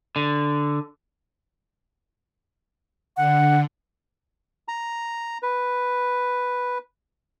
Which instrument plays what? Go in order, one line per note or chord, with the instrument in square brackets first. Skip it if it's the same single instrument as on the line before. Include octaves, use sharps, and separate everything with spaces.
[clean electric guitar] D3
[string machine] D3 [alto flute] F#5
[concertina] A#5
B4